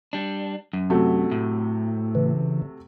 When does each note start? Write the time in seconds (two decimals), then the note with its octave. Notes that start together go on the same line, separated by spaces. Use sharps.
0.13 G3 D4
0.73 F#2
0.90 C3 F#3 A3
1.31 A2
2.15 C#3 E3